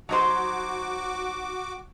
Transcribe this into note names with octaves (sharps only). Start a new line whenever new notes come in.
F#3 D#4 F#4 C5 D6